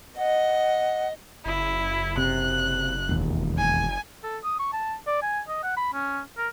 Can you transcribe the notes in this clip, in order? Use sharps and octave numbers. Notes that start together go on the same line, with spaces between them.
D#5 F#5
F#1 E4
C3 F#6
E1 D#2
G#5
A4
D#6
C#6
A5
D5
G#5
D#5
F#5
B5
C#4
A#4